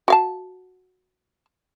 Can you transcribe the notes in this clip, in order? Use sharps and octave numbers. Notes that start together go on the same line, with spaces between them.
F#4 F5 A5